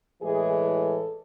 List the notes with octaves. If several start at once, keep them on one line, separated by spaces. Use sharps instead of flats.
A2 E3 G#3 G#4
A4